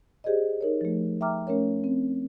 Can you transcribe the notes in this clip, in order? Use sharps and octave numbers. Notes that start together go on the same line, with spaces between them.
G4 G#4 C5 D5 D#5
D#4 A#4 C#5
F3 A3
E5 G5 A#5 D6 F6
A3 C#4 A#4 C#5
C4